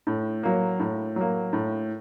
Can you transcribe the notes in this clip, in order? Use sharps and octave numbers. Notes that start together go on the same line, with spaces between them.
A2
F#3 A#3
A2
F#3 A#3
A2